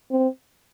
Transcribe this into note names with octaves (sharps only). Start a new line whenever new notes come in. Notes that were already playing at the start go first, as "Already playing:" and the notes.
C4